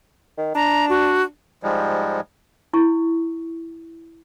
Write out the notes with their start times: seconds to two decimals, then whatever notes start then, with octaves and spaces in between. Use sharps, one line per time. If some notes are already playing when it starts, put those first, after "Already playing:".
0.38 D#3
0.55 D4 A#5
0.89 F#4
1.63 G#2 F3 G3 G#3
2.74 E4 C#6